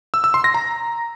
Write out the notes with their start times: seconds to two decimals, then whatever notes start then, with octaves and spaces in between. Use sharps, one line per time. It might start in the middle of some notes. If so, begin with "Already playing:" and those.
0.14 E6
0.24 E6
0.34 C6
0.44 A#6
0.54 A#5